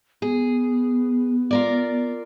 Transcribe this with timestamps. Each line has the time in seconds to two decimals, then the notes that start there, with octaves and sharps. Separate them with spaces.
0.22 B3 G#4
1.51 F4 A#4 D5